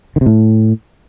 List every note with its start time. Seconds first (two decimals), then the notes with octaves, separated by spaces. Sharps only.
0.16 D#3
0.21 C3
0.26 A2